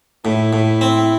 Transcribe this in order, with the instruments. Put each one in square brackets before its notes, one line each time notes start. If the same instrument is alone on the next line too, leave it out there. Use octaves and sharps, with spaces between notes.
[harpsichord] A2 [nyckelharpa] E4
[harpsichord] A2
C4